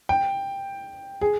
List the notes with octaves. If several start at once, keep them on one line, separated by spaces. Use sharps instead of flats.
G5
G#4